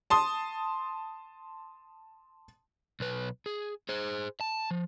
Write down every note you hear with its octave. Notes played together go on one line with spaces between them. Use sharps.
A5 C6 D#6
B1 B4
G#4
G#4 C5
A5
F3